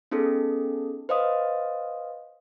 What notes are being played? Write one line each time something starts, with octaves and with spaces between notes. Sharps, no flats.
B3 C#4 D#4 G#4 A4
B4 C5 D#5 F5 D#6